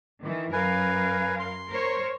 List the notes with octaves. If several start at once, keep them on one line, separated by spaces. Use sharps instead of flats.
D#3 E3
F#2 A#4 B4 F5 G#5
C6
A#4 C5 C#5